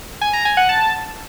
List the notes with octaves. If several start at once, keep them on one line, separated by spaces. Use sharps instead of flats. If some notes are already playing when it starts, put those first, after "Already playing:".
G#5
A#5
G#5
F#5
A5